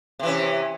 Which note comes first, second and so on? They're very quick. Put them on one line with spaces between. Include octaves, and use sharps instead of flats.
C3 E3 C#4